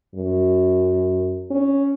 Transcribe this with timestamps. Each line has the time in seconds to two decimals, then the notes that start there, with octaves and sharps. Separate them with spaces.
0.15 F#2
1.51 C#4